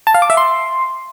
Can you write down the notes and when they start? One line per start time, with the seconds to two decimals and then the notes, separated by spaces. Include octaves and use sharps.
0.07 A5
0.14 F5
0.22 D6
0.30 E5
0.37 C6